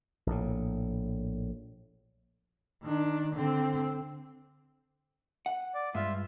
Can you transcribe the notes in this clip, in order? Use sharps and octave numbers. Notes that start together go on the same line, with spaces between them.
A#1 A2
D#3 D4
D3 C4
F#5
D5
G2 G#3 F4 E5